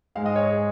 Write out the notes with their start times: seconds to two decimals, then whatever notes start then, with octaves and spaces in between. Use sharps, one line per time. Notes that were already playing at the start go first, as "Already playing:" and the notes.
0.15 G#2 G#3 F5
0.26 D#5
0.36 C#5
0.45 G#4
0.56 G#3